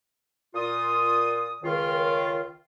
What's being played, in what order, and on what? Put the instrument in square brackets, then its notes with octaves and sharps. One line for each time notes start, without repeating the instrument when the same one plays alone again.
[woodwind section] A#2 F4 D#6
C#2 D#3 F4